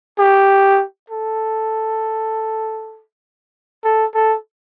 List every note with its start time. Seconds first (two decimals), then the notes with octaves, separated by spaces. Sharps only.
0.18 G4
1.10 A4
3.84 A4
4.14 A4